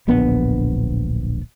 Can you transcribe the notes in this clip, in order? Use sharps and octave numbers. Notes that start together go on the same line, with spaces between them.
D1 A#1 B3 D4